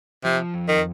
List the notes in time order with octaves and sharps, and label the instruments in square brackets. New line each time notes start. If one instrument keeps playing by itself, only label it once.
[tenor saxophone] C3 [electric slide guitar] F3
[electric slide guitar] F2
[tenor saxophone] D#3